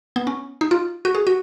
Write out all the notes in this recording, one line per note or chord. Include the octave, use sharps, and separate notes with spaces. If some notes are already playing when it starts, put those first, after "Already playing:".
B3
C#4
D#4
F4
F#4
G#4
F#4